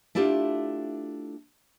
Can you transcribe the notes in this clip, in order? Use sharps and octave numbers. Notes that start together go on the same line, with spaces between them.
A3 D4 E4 F4 G4